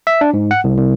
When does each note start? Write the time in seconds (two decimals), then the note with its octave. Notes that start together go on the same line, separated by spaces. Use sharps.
0.07 E5
0.21 D4
0.34 G#2
0.51 F#5
0.64 C2
0.77 C2